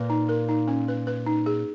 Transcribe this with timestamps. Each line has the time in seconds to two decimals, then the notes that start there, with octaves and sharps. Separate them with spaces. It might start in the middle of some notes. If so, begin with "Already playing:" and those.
Already playing: A#2 B4
0.10 D#4
0.29 A#4
0.49 D#4
0.68 C#4
0.88 B4
1.07 B4
1.27 D#4
1.46 G#4